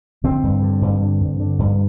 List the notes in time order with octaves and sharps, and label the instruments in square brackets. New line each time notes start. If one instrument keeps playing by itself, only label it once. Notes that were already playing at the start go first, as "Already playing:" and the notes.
[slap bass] D3 C4
G2
D3
G2
D3
G2
D3
G2